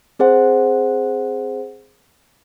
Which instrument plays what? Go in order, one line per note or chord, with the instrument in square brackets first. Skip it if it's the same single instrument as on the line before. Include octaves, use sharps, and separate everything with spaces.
[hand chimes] C4 G#4 C5 F#5